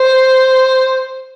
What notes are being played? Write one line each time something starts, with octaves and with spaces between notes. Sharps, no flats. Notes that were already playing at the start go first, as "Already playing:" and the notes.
Already playing: C5